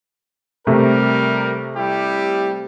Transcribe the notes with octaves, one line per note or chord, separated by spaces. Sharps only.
C3 G3 A3 A#4
G3 E4 G4